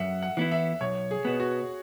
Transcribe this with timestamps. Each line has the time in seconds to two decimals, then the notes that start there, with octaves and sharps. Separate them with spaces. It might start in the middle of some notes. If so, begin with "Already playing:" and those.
Already playing: F#2 E5 F#5
0.22 F#5
0.37 E3 B3 E4
0.51 E5
0.81 B1 C#5
1.11 G#4
1.25 B2 B3
1.40 F#4